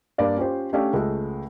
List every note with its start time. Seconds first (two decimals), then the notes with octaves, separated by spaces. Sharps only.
0.18 G2 A#3 D5 F5
0.37 C#4 F4 G4 C5
0.73 A3 C#4 D4 G4 D5 F5
0.93 C#2 G#3 A3